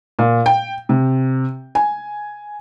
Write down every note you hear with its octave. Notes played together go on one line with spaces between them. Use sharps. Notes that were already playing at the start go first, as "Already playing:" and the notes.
A#2
G5
C3
G#5